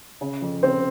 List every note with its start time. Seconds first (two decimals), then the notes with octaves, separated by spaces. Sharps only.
0.21 C#3
0.42 F2
0.63 C#3 C4